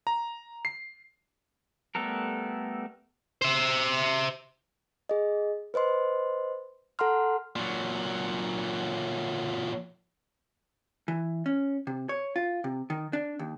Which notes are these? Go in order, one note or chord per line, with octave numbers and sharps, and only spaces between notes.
A#5
C7
G3 A3 B3 A4 A#4
C5 E5
G#4 D#5
B4 C5 D#5 C6
A4 F#5 A#5 C6 F6
A#2 F#3
E3
C#4
C3
C#5
F4
C3
D#3
D4
D#2